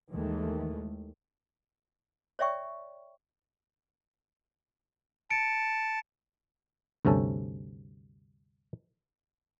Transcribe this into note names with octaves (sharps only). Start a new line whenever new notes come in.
D#2 D#3 E3 G#3 A3
C#5 D5 E5 G5 C#6
A5 C#7 D7
D2 G2 C3 C#4 A4